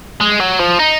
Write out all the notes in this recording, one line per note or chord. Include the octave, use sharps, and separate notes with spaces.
G#3
F#3
F3
D#4